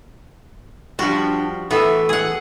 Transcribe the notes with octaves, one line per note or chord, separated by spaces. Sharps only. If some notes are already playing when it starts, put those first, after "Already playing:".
F3 G3 D4 F#4
A2 E3 B3 A4
G#4 F#5